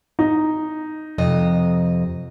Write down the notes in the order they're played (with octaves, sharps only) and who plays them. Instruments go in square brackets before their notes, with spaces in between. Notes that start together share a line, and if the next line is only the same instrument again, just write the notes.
[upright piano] D#4
[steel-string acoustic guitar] F2 C3 D#5